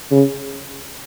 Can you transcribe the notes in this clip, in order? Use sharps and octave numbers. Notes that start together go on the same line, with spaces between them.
C#3